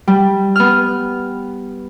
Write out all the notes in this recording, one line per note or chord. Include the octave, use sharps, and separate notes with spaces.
G3
B3 F6